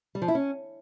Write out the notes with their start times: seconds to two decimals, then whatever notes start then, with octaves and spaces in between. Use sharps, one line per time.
0.15 G3
0.22 F3
0.28 E4
0.35 C#4